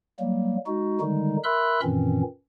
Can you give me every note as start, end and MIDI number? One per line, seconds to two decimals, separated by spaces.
0.20 0.57 54
0.20 0.57 55
0.20 0.57 58
0.67 1.01 56
0.67 1.01 63
0.67 1.01 66
1.01 1.37 50
1.01 1.37 51
1.01 1.37 55
1.01 1.37 56
1.01 1.37 63
1.44 1.80 70
1.44 1.80 76
1.44 1.80 83
1.44 1.80 84
1.44 1.80 88
1.44 1.80 90
1.83 2.22 42
1.83 2.22 46
1.83 2.22 51
1.83 2.22 52
1.83 2.22 60
1.83 2.22 61